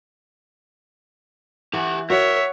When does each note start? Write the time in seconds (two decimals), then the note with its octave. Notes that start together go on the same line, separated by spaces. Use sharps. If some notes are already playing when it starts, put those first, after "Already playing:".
1.73 E3 G4 F#5
2.10 F#4 A#4 C#5 E5